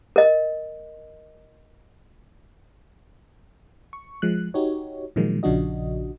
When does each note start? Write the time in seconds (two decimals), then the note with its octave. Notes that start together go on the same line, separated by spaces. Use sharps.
0.16 A#4 D#5
3.93 C#6
4.22 F3 G#3 F#6
4.54 D#4 F#4 G4 C#5
5.16 A#2 D#3 F3 F#3 G#3 A#3
5.43 A#1 C#3 F3 D4 F#4 D#5